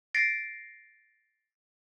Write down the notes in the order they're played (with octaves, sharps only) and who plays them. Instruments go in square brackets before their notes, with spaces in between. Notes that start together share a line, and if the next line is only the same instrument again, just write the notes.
[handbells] A6 A#6 C7 D7